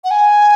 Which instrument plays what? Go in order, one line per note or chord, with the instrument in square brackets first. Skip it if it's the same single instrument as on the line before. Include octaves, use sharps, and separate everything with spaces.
[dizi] F#5
G#5